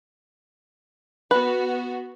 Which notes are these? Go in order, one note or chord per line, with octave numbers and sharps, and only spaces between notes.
B3 F#4 B4